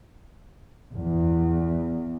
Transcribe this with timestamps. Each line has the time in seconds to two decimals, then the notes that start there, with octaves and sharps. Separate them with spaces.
0.94 E2